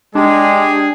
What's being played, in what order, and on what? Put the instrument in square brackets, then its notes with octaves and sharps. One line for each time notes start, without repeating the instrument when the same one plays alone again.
[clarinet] G#3 [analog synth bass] D4 [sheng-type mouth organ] G4 [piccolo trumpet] G#4